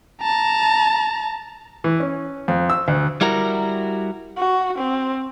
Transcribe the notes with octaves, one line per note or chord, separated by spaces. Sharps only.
A5 A#5
E3
C#4
F2
E6
D2
G3 E4 F#4 A#4
F#4
C4